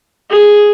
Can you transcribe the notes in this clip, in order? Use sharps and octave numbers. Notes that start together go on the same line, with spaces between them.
G#4